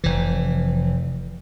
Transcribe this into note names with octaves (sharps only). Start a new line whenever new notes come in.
F1 E3